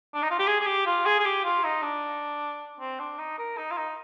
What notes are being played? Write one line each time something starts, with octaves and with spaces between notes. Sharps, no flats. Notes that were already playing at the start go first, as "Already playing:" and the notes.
D4
D#4
F4
G4
G#4
G#4
G4
F4
G#4
G#4
G4
F4
D#4
D4
C4
D4
D#4
A#4
D#4
F4
D#4